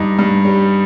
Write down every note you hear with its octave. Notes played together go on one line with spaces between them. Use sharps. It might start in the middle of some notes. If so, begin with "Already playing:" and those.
Already playing: G2 D#4
G2
G3